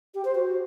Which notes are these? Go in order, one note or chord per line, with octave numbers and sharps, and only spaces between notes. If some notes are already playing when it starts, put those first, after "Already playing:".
G4
C5
F#4